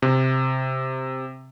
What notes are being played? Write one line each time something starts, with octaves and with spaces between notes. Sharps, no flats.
C3